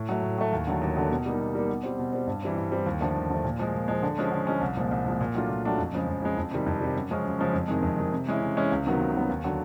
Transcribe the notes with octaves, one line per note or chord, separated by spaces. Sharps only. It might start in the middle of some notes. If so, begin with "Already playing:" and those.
Already playing: A2
F#3 A3
A2
F#3 A3
D#2
D3 F#3 A3
D#2
D3 F#3 A3
B2
G3 A#3 D#4
B2
G3 A#3 D#4
B2
G3 C4
B2
G3 C4
G2
E3 G3 C4
G2
E3 G3 C4
D#2
D3 F3 A3
D#2
D3 F3 A3
A#2
F3 G#3
A#2
F3 G#3
D3
F3 G#3 C#4
D3
F3 G#3 C#4
C2
A#2 F3 G#3
C2
A#2 F3 G#3
A#2
F#3 A3 D4 F4
A#2
F#3 A3 D4 F4
F2
C#3 F3 G#3
F2
C#3 F3 G#3
F2
C3 D#3 G3
F2
C3 D#3 G3
F#2
C#3 F3 G#3 C#4
F#2
C#3 F3 G#3 C#4
F2
C3 D#3 G#3
F2
C3 D#3 G#3
C3
E3 G#3 C#4 E4
C3
E3 G#3 C#4 E4
C#2
C3 D#3 F#3 B3
C#2
C3 D#3 F#3 B3
D#2
D3 F#3